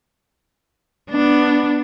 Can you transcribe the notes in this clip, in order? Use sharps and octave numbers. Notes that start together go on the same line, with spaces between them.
B3 D4